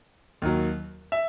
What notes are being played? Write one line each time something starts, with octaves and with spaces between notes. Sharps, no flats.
D#2 D#3 F#3
E5